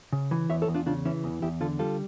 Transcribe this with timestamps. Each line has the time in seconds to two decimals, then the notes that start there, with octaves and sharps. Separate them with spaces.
0.12 C#3
0.31 E3
0.50 E2 C#5 E5
0.62 A4 C#5
0.68 E2
0.75 D4 F4
0.86 C#3 D4 F4
1.05 E3 C#4 E4
1.24 E2
1.42 E2 E4 G4
1.61 D3 F4 A4
1.79 G3 F4 A4